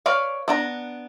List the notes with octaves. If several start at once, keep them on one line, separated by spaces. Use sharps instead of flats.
B4 C#5 D5 F5
B3 D4 A#5